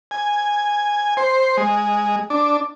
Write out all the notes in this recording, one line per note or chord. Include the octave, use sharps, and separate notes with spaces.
G#5
C5
G#3
D4